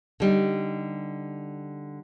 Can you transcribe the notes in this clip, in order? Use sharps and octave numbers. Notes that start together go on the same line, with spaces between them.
D3 G3 D#4